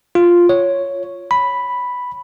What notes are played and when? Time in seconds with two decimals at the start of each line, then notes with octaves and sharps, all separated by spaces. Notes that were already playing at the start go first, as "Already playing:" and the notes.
0.15 F4
0.49 C#5
1.31 B5